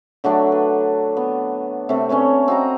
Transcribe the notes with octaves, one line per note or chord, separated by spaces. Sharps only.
D3 F#3 A3 D4
B4
B3
C3 A3
C#4 D4 B4 C#5
C4 F#4 D#5 A#5